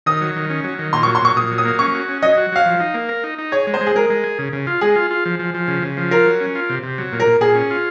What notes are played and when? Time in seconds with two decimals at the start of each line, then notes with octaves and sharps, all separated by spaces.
0.06 D#3 D#6
0.21 F#3
0.36 D#3
0.50 C#4
0.64 F#3
0.79 D#3
0.93 A#2 C6
1.03 C#6
1.07 F#3
1.15 C6
1.22 A#2 C#6
1.36 A#2 D#6
1.51 F#3
1.58 D#6
1.65 A#3
1.79 C#4 C#6
1.94 F#4
2.08 C#4
2.22 F#3 D#5
2.38 F#4
2.52 F#3 F5
2.66 F3
2.80 D#4
2.94 A#3
3.09 A#4
3.24 D#4
3.38 D#4
3.52 G#4 C#5
3.67 G#3
3.74 C5
3.81 G#3
3.87 G#4
3.96 G#3 A#4
4.10 G#3
4.24 G#4
4.39 C#3
4.53 C#3
4.67 F4
4.81 G#3 G#4
4.96 F4
5.10 F4
5.26 F3
5.39 F3
5.54 F3
5.68 C#3
5.82 C#3
5.97 F3
6.11 F4 A#4
6.26 F#3
6.40 C#4
6.55 F4
6.69 C3
6.83 C3
6.98 F#3
7.12 A#2
7.20 A#4
7.26 A#2
7.41 A#2 G#4
7.55 C#4
7.70 F4